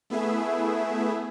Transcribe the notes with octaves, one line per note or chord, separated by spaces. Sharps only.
A3 B3 E4 G#4 E5